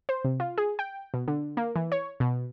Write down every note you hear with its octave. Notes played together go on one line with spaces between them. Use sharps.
C5
C3
F4
G#4
G5
B2
D3
A#3
E3
C#5
B2